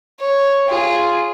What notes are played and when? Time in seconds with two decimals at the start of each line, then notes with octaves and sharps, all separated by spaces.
0.20 C#5
0.68 F4 G#4